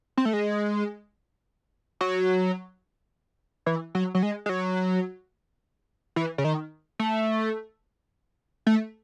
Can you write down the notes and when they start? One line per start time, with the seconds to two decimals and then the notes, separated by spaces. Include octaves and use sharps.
0.17 C4
0.25 A3
0.33 G#3
2.01 F#3
3.66 E3
3.95 F#3
4.15 F#3
4.23 G#3
4.46 G#3
4.49 F#3
6.16 E3
6.38 C#3
6.45 D#3
6.99 A3
8.67 A3